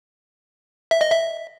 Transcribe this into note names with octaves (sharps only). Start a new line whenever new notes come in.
E5
D#5
E5